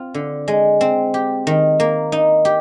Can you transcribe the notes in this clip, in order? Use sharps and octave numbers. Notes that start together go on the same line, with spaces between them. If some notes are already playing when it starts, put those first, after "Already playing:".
Already playing: C4 F4
D3
G#3
C4
G4
D#3
A#3
D#4
G4